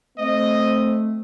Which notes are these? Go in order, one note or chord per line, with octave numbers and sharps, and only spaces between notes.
A3 C4 D#5